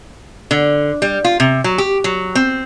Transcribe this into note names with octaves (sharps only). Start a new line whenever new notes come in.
D3
G3
F4
C3
F#3
G4
F#3
C4